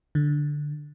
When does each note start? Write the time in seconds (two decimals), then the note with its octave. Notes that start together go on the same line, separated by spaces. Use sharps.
0.15 D3